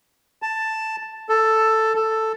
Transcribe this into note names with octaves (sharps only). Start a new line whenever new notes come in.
A5
A4
A4